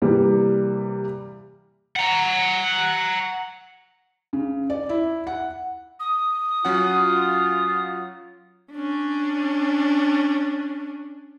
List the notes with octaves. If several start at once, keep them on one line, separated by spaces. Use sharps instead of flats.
C3 E3 G3 A#3
F#5 A#5
C#3
D5
E4
F#5
D#6
F#3 C#4 F4 F#5
C#4 D4